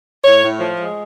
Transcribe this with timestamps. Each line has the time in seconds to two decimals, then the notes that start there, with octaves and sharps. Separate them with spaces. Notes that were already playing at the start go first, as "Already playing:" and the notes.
0.25 A2 C#5
0.43 A2
0.60 F3
0.78 G#3